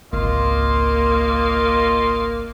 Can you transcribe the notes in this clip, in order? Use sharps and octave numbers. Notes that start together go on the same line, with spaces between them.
G#1 C#2 A#3 F4 D#5 C6